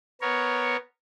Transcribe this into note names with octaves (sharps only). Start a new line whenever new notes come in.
B3 A#4 C#5